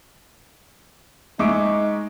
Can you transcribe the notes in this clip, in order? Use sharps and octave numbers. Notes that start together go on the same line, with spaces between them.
G#3 D#4 E5 C#6 D6